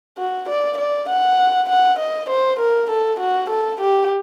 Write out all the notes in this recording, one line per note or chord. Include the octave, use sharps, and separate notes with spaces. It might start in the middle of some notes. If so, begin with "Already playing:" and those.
F#4
D5
D5
F#5
F#5
D#5
C5
A#4
A4
F#4
A4
G4